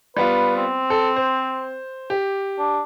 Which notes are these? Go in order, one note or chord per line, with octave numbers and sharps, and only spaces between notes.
G3 B3 F4 B4
C4
A4
C5
G4
D4